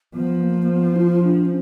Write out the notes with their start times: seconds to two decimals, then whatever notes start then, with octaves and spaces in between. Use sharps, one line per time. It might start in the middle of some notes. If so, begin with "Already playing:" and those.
0.14 F3 B3
0.43 A#3
0.62 A#3
0.72 B3
0.96 E4
1.01 F4
1.23 D4
1.45 C#4